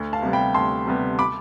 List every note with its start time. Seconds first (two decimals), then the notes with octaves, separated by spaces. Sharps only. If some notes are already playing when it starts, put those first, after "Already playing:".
Already playing: D2
0.13 F5 A5
0.22 C3 G3 B3
0.33 G5 B5
0.54 D2 A5 C6
0.87 C3 G3 B3
1.19 B5 D6